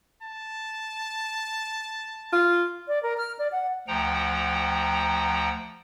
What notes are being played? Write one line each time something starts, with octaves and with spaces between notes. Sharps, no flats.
A5
F4
D5
A#4
F6
D5
F#5
D2 F3 F#5 G5 A#5